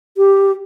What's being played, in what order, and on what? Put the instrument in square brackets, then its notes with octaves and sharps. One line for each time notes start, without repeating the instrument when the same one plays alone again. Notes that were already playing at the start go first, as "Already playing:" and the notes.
[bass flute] G4